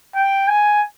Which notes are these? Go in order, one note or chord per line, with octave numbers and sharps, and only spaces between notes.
G5
G#5